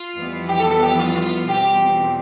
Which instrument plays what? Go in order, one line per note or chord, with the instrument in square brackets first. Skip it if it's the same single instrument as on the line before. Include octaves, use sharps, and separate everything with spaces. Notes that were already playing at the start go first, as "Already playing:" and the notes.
Already playing: [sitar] F4
[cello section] F2 E3 G3 B3 E4
[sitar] G4
A4
A4
G4
F4
F4
[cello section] E2 B2 G3 C4 [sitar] G4